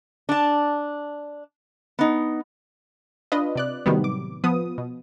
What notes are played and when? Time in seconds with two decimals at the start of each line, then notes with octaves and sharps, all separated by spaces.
0.29 D4 A5
1.99 B3 D#4
3.32 D4 F4 B4 D#5
3.56 C3 D5 F#6
3.86 A2 C3 D#3 F#3 G3 B3
4.04 D6
4.44 F3 B3 D#6
4.78 B2